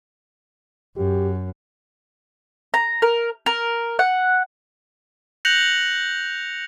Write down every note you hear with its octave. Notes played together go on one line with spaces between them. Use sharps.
F#2 G4
A#5
A#4
A#4
F#5
F#6 G6 A#6 C#7 F7 F#7